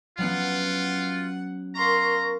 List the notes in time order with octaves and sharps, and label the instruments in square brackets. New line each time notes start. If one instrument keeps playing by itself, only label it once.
[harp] F#3 B3 C#4 [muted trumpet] F4 [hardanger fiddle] F#5
[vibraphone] A#4 C#6 [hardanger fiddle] F5 C6 [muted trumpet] A#5